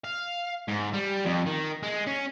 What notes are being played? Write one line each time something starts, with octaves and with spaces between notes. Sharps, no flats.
F5
G#2
G3
F2
D#3
G#3
C#4